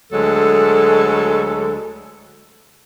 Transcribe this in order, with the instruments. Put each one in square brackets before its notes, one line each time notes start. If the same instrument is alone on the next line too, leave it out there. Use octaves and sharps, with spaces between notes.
[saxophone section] D2 F#3 G#3 A4